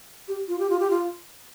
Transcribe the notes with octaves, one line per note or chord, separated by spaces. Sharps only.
G4
F4
G4
F4
G4
F4